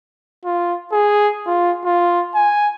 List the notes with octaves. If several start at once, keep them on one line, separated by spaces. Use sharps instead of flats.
F4
G#4
F4
F4
G#5